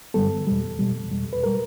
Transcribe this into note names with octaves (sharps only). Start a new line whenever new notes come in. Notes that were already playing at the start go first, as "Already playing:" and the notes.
G2 D3 G3 B3 A4
E2 B2 G3
E2 B2 G3
E2 B2 G3
B4
B2 G3 A#4